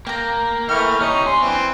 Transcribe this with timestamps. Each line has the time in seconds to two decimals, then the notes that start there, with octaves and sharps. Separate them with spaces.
0.07 A#3 G5 A#5
0.69 E3 A3 G5 C#6 F6
1.01 D#4 E4 G4 C#5
1.26 D4 G#5 C6
1.42 E3 C4